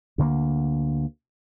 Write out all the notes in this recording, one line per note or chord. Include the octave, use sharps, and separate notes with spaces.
D2 D3 G#3 A#3